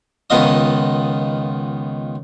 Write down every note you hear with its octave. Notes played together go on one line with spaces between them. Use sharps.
C#2 D#3 B3 F4 D#5 D#6